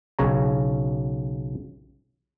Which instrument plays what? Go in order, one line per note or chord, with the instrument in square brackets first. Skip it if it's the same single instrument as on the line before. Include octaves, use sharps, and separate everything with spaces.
[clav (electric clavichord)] B1 C#3 C#5 A#5